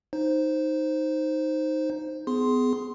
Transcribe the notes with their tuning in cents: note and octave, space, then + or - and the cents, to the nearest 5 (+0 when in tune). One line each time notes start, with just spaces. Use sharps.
D#4 +0 C5 +5
B3 +25 G#4 +15 C6 +0